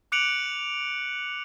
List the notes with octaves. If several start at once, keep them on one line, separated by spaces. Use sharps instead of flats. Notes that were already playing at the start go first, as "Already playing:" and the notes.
D6 F#6 C#7 D7 F7 F#7